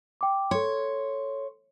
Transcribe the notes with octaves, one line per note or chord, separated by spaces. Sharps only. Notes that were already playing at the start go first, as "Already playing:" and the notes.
G5 D6
A4 C#5 C6